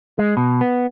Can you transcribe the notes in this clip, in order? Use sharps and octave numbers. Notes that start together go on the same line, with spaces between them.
G#3
B2
B3